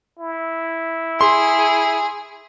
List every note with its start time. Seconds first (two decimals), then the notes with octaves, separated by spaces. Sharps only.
0.19 E4
1.21 G#4 C6